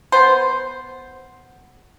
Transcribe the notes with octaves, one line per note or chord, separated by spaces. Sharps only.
B3 C5